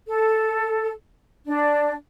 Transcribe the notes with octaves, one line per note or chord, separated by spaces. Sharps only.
A4
D4